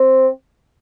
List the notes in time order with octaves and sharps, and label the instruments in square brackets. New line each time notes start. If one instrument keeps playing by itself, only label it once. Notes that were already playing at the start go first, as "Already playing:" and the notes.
Already playing: [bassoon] C4